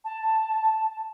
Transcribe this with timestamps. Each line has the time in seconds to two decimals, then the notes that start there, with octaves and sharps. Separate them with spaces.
0.04 A5